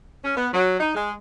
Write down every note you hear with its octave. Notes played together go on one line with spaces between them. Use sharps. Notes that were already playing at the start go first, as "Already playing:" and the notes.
C#4
B3
F#3
D#4
G#3